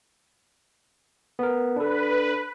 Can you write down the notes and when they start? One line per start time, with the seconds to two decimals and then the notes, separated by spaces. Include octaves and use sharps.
1.39 B3 A#4
1.76 D4 A4 B4